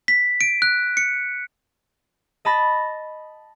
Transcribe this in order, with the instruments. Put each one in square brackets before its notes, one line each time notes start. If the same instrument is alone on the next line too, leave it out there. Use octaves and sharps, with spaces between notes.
[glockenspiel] B6
D7
F#6
C#7
[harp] D#5 A5 B5 A6 A#6